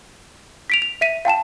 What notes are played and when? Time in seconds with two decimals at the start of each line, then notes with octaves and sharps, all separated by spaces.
0.70 B6 D7 F7
0.82 F7
1.01 E5 B6 D#7
1.25 F5 G5 A5 E7